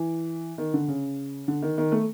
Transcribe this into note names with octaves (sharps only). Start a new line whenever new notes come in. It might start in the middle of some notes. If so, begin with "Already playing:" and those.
Already playing: E3
D#3
D3
C#3
D3
D#3
D#3
A3